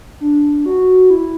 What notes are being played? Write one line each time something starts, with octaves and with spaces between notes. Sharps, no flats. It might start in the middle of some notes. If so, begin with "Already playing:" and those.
D4
F#4
E4